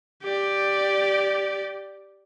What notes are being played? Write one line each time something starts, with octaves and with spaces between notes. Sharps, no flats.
G4 D5